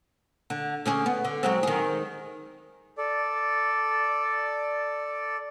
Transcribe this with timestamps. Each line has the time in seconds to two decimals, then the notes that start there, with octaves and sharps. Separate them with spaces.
0.50 D3
0.86 D3 C#4 G#4
1.06 B3
1.25 D3
1.43 F#3 G#3 C4
1.63 D#3 G#4
2.98 A4 D5